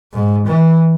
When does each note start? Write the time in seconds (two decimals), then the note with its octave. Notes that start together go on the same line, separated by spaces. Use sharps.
0.13 G#2
0.46 E3